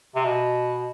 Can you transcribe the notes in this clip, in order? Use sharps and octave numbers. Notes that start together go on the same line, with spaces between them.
C3
B2